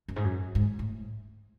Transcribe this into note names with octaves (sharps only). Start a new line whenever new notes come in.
F#2
G#2
F#2
G#2
A2